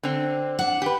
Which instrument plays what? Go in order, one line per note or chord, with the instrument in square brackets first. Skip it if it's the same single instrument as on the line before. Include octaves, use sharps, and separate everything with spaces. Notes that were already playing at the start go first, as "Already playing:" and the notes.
[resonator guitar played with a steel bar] D3 C4
[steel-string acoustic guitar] D4 F#5
[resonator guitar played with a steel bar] G4 B4